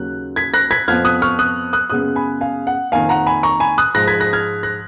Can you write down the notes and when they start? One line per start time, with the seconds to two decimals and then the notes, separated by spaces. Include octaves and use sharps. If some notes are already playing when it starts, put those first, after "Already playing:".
Already playing: D#2 C#3 F#3 F#6
0.36 G#6 B6
0.54 F#6 A#6
0.71 G#6 B6
0.88 F2 F3 B3 F6 G#6
1.05 D#6 F#6
1.22 C#6 F6
1.39 D#6 F#6
1.73 D#6 F#6
1.90 F#2 C#3 G#3 B3 D#6 F#6
2.16 G#5 B5
2.41 F5 G#5
2.67 F#5
2.92 F2 D#3 A#3 F5 G#5
3.09 F#5 A#5
3.27 G#5 B5
3.43 A#5 C#6
3.60 G#5 B5
3.78 D#6 F#6
3.95 G#2 F3 G#3 F#6 A#6
4.07 G#6 B6
4.20 F#6 A#6
4.33 F6 G#6
4.63 F#6 A#6